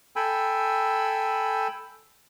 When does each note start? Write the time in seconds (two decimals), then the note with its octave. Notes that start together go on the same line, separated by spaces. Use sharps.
0.16 A4 G5 G#5 B5 E6